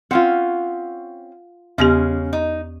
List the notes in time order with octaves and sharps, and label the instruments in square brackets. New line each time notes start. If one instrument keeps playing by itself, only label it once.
[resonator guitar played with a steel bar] C4 C#4 [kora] F4 F#5
[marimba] E2 B3 G4 [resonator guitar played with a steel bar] C#3 G#3 C#4
[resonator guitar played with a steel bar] D#4